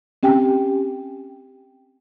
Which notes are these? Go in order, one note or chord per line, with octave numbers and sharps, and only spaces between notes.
C4 C#4 G4 G5 G#5